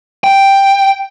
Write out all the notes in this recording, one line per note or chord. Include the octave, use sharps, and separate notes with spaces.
G5